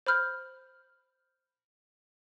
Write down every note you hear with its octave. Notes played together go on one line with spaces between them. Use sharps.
C5 B5 F6 G6